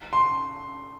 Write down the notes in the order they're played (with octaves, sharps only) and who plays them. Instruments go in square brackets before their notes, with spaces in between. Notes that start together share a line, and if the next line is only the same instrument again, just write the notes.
[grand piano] C6